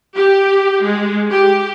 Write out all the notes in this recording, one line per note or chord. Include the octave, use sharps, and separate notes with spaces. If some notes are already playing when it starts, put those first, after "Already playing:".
G4
G#3
G4